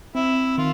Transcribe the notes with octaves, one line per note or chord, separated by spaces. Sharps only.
C4 E4
D#3 F4